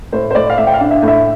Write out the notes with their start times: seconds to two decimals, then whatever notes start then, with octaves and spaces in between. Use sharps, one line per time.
0.12 A2 C5
0.30 C5
0.35 A2 D5
0.50 F5
0.57 A2 E5
0.67 G5
0.74 F5
0.80 D4
0.91 E5
1.02 A2
1.08 E5